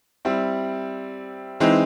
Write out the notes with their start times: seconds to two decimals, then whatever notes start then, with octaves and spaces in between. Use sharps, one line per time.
0.25 G3 C4 E4
1.60 E3 G#3 C4 D#4